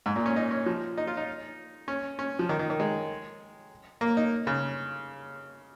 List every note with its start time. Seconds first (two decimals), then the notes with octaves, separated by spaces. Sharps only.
0.06 G#2
0.16 A#2
0.26 C#4
0.36 D#4
0.51 C#4
0.66 F3
0.97 D#4
1.07 F4
1.17 D#4
1.88 C#4
2.19 C#4
2.39 F3
2.49 D#3
2.59 D#3
2.70 D#3
2.80 G#3
4.01 A#3
4.17 D#4
4.47 C#3